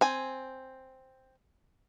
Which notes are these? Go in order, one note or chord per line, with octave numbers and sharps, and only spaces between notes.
C4 G#5